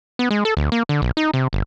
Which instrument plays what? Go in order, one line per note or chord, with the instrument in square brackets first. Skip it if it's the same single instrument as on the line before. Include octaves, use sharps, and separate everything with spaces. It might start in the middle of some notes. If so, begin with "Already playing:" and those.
[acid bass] B3
G#3
A4
D2
A#3
D3
B1
D#4
C3
G1